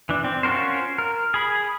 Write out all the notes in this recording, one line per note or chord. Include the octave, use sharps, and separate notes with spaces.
E3 D4
C4
C#4 F4 F#4 A#4 C5
A#4
G#4 B5